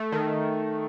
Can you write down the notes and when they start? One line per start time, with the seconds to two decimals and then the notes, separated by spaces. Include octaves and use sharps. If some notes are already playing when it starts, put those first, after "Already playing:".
Already playing: A3
0.12 D#3